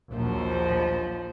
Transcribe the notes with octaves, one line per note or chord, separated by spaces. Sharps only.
A#1 D#2 F3 F#3 C5